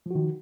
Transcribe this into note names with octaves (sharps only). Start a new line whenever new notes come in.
D#3 F3 F#4